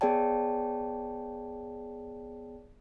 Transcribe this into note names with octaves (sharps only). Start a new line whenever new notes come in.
B3 G#4 C#5 D5 G5 A5